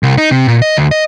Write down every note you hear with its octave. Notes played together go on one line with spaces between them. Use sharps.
C2
D#4
C3
A#2
D#5
D2
D#5